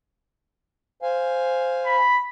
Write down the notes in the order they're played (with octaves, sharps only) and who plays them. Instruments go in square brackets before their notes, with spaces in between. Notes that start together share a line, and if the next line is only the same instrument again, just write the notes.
[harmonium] C5 F5 G#5
[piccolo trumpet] B5